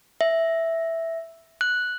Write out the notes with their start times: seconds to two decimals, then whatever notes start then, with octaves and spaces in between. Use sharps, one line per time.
0.21 E5
1.61 F#6